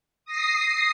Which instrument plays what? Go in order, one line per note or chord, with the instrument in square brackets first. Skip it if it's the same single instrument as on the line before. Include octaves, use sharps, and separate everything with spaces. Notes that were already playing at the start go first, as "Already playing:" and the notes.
[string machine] D#6 A#6 C7